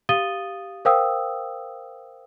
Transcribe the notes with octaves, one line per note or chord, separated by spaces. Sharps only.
G4 F5 D#6 A6 D#7 G7
A#4 C5 F5 G5 D#6 E6